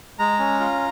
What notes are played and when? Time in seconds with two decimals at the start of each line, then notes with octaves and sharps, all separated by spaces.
0.19 G#3 A#5
0.39 C#4
0.60 F4